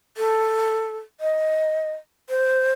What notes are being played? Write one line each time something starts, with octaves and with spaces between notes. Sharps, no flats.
A4
D#5
C5